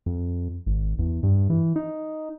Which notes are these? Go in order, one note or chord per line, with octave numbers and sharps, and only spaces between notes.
F2
G#1
E2
G2
E3
D#4